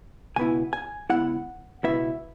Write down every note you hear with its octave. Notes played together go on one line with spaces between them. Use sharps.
C#2 B2 B3 E4 G#5
G#5
C#2 B2 B3 E4 F#5
C#2 B2 B3 E4 E5